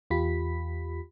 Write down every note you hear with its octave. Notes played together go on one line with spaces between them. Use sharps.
E2 F4 G4 B5 B6